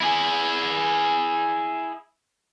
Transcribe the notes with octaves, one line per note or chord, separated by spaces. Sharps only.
E4 G#4